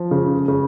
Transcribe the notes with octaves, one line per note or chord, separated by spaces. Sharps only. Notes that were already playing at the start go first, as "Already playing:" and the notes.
Already playing: F3
C#3
C#3